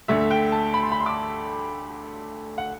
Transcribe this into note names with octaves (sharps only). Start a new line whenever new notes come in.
D2 D3 A3 E5
G5
A5
B5
C6
B5
C6
D6
F#5